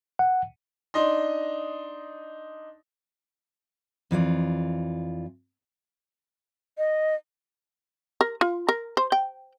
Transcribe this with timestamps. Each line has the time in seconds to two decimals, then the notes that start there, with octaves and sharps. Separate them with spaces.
0.19 F#5
0.94 D4 D#4 D#5 C6
4.11 F2 E3 F4 D5
6.78 D#5
8.21 A#4
8.41 F4
8.69 A#4
8.97 C5
9.12 G5